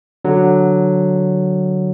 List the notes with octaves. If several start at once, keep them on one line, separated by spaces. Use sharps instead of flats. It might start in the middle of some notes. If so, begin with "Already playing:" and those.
D3 F#3